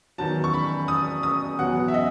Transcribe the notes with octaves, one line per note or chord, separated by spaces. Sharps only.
E2 D#3 F#3 A5
C#6
B5
D#6
D#6
E2 B2 F#3 F#5
E5
D#5